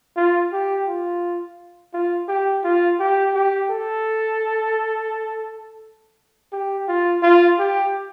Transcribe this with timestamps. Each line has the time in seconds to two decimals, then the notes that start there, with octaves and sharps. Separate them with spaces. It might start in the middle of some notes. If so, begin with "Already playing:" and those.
0.17 F4
0.53 G4
0.88 F4
1.94 F4
2.28 G4
2.64 F4
2.99 G4
3.35 G4
3.70 A4
6.52 G4
6.88 F4
7.22 F4
7.59 G4